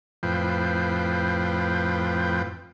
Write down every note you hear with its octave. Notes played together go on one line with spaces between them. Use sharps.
F2 A2 F3 B4 C5 G5